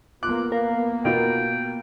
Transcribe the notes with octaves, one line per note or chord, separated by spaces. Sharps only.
A#3 B3 F4 D6 F#6
A#4 F5
B2 F4 G5